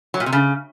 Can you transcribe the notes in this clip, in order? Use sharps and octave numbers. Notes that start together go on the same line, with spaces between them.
F#3
A#2
C3
C#3